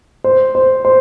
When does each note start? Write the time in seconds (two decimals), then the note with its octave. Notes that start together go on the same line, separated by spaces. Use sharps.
0.24 C5
0.55 C5
0.85 C5